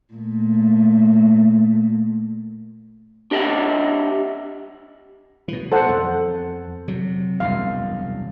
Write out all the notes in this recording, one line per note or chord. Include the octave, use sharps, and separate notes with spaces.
A#2 A3
D4 G4 D#5 E5 F#5
B2 E3
A4 C5 F#5
F2
C3 F#3
E1 C2 F#2 F5